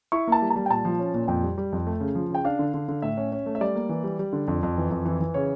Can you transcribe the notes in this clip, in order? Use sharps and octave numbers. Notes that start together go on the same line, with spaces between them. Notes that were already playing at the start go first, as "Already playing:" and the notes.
E4 C#6
A#3 A5
G3
A5
G3
G5
A#2 A5
F3
C#4
A#2
F2 G5
G3
G3
F2
A3
C#3
F3
C#3 G5
D4 F5
D3
D3
D3
A2 E5
C#4
C#4
A3
E5
G3 D5
A#3
E3
G3
G3
D3
F2
F2
E3
F2
E3
E3
C#3 C#5